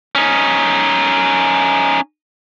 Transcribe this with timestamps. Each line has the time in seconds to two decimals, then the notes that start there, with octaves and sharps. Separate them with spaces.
0.15 C#4 D#4